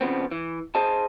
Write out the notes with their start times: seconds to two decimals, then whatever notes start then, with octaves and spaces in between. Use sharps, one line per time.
0.01 C#3 F3 B3 C4
0.31 E3
0.75 G#4 C5 D#5 A5